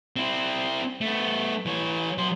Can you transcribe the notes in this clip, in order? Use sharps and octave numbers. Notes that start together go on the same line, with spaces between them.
C4 E4
A3 B3
E3 C#5
F#3 C6